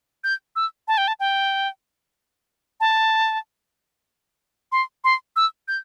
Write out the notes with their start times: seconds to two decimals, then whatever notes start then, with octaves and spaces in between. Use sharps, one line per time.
0.24 G6
0.56 E6
0.88 A5
0.98 G5
1.08 A5
1.20 G5
2.80 A5
4.72 C6
5.04 C6
5.36 E6
5.68 G6